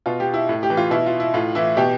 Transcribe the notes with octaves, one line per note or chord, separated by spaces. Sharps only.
B2 F4
G4
E4
A2
G4
E3
F4
B2 E4
F4
E4
A2 F4
E3 E4
B2 G4